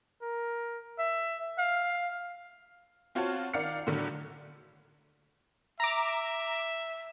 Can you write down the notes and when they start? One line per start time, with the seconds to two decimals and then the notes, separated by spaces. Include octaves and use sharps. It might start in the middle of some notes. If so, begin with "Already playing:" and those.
0.22 A#4
0.98 E5
1.58 F5
3.15 C4 F4 F#4 C#5 F#5 A5
3.54 D#3 D5 F5 F#5 F6 C#7
3.87 A2 D3 F#3
5.80 E5 A#5 D6